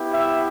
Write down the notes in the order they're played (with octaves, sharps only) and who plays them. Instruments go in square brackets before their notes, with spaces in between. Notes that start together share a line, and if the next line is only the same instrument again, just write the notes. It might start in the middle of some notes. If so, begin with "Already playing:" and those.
Already playing: [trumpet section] B3 E4 G4
E5